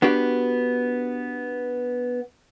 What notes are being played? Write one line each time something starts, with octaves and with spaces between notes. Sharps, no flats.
B3 D4 F#4 G4